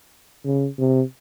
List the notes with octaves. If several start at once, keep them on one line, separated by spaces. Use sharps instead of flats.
C#3
C3